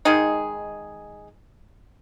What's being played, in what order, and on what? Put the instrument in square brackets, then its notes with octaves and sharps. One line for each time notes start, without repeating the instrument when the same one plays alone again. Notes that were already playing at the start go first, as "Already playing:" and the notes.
[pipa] D#3 G#3 D#4 G#4